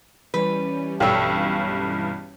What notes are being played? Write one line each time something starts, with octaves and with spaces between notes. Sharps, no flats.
E3 G3 C#4 B4
B1 G2 A4 C#5 G5 E6